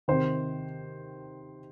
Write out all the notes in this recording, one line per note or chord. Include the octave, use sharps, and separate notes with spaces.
C3 D#3 C5